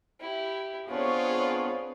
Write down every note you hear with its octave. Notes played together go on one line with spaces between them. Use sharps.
E4 G4
B3 C4 D4 F4 G#4 B4 C#5